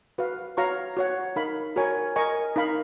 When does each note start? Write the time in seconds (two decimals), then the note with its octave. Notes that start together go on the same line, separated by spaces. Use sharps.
0.18 F#4 B4 F5
0.57 F#4 C#5 F5 A#5 C#6
0.97 F#4 C#5 F#5
1.36 D#4 A#4 F5 B5
1.76 F#4 A#4 C#5 G#5
2.16 A#4 D#5 G#5 C#6
2.56 D#4 A#4 F5 B5